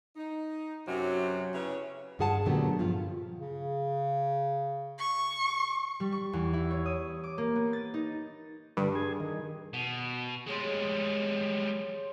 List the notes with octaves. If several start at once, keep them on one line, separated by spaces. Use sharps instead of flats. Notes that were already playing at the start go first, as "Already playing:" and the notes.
D#4
F#2 C3 F#3
C#3 E4 B4 C#5
G2 F4 G#4 F#5 A5
A#2 D3 F#3 A3 B3 G4
G2 F3 F4
C#3
C#6
G3
C#6
E2
E4
C#5
D#6
D6
A#3
B3
A6
D#4
G2 D3
G#4
D#3
B2
G3 G#3 G#4 C#5 C6